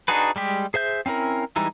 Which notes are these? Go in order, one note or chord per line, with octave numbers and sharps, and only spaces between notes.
D4 D#4 F#4 G#4 B4
G3 G#3 G4
G#4 C5 E5 G6
C4 C#4 E4 A#4
E3 G3 G#3 D#4 E4